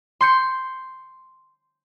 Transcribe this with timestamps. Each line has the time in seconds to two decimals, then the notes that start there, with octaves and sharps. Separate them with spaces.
0.21 C6 G6 C#7